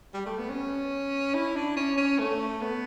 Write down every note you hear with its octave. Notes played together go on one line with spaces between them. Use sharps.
G3
A3
B3
C#4
E4
D4
C#4
C#4
A3
B3